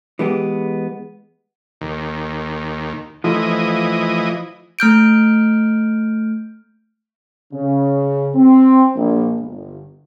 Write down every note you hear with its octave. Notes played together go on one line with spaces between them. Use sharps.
E3 G#3 B3 G4
D#2
E3 F3 A3 F4 D#5
A3 F6 G6 D7
C#3
C4
A#1
G1